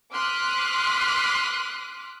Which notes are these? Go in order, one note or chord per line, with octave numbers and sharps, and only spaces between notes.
C6 D6 D#6 F6 F#6 B6